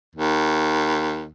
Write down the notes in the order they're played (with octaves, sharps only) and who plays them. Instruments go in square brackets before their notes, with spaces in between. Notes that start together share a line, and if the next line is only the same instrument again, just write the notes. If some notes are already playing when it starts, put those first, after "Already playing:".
[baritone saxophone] D#2